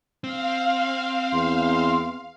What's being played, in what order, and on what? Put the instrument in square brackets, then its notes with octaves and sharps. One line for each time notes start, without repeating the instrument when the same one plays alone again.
[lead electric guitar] C4 [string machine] F5
[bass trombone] E2 [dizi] C6